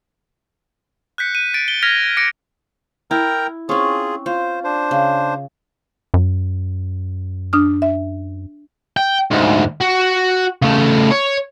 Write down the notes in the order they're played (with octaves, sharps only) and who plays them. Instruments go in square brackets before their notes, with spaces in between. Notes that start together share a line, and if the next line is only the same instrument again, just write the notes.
[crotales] F#6 G6 B6 C#7
D#7
A6 D7
G7
F6 G#6 A#6 B6 F7 G7
D6 F6 A#6 C#7 D7
[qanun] E4 [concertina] A#4 G5 A#5
[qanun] C4 C#4 [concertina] F4 G#4
[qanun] F4 [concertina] C5
[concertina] D4 C5
[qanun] C#3
[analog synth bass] F#2
[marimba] D4 D#6 F6
E5
[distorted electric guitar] G5
D2 G#2
F#4
C#3 A3
C#5